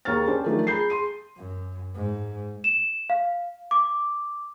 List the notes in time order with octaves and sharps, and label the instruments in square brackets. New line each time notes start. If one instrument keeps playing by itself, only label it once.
[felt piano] D#2 G#4 A#5 C#6 F6 A6
C#4 D4 G4 A4 C5
D#3 F3 F#3 A3 D4
G#4 A#5 B5 G6 C7
G#4 C6 D#7
[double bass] F#2
G#2
[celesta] E7
F5
D6